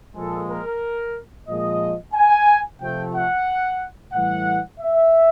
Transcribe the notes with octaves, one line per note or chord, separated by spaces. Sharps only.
A#2 F3 G#3 A4
A#4
A#2 F3 G#3 D#5
G#5
C3 F3 A3 G5
F#5
A2 E3 G3 F#5
E5